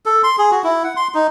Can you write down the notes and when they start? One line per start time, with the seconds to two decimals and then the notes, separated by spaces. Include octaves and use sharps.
0.06 A4
0.24 C6
0.38 G#4
0.51 F#4
0.64 E4
0.84 F#5
0.96 C6
1.14 D#4